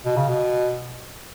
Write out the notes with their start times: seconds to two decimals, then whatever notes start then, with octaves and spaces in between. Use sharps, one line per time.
0.05 B2
0.17 C#3
0.28 B2